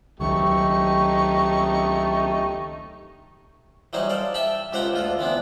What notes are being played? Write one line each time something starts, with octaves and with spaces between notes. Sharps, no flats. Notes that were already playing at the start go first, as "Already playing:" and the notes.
C#2 D#3 F#3 A3 D#4 G4 C#6
E3 F#3 G3 D#4 C5
A4 D5 F5
E5 G5 A5 B5
C#2 G4 C5 F#5 G5 A#5
D2 F4 A4
E3 B3 C4 D4